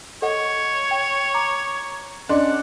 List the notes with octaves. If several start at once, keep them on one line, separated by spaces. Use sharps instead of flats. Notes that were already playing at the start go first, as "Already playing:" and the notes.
A4 C#5 D#5 F#5
G5
A#5 D6
C#4 D4 D#5 F#5 C6 F#6